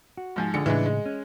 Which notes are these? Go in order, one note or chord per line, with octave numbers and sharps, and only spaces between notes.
F#4
G#2 F3 G#5
A#1 D3 G#4 C#7
A2 C#3 E3 G#3 D4
G#3
C#4